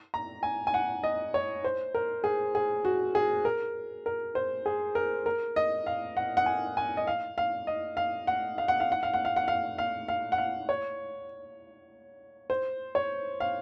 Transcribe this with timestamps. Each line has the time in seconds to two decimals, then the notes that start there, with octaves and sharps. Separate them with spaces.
0.14 A#5
0.43 G#5
0.67 G#5
0.74 F#5
1.03 D#5
1.34 C#5
1.64 C5
1.94 A#4
2.24 G#4
2.55 G#4
2.85 F#4
3.15 G#4
3.45 A#4
4.06 A#4
4.35 C5
4.66 G#4
4.95 A#4
5.26 A#4
5.56 D#5
5.86 F5
6.17 F#5
6.37 F#5
6.46 G#5
6.77 G#5
6.97 D#5
7.07 F5
7.38 F5
7.67 D#5
7.97 F5
8.27 F#5
8.58 F5
8.68 F#5
8.80 F5
8.92 F#5
9.03 F5
9.14 F#5
9.25 F5
9.36 F#5
9.48 F5
9.78 F5
10.08 F5
10.32 F#5
10.38 F5
10.69 C#5
12.50 C5
12.95 C#5
13.40 F5